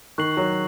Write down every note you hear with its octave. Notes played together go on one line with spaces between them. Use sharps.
D#3 C#6 F#6 C7 F#7
F#3